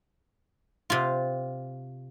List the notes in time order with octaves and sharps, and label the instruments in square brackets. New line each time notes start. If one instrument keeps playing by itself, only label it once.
[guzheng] C3 F4